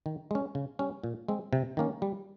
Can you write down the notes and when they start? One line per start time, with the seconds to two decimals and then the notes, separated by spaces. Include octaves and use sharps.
0.06 D#3
0.31 G#3 C#4
0.55 C#3
0.79 G3 C#4
1.04 A#2
1.28 G#3 C4
1.53 C3
1.77 D#3 A#3 C#4
2.02 G3